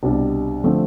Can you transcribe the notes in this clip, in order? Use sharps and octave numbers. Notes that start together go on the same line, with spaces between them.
C2 B2 G3 D4
D3 F3 A3 C4